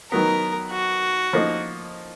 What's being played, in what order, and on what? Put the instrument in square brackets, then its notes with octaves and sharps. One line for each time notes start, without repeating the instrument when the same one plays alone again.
[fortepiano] D#3 F#3 B3 [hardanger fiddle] A#4
[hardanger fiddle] F#4
[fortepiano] F3 A#3 D#4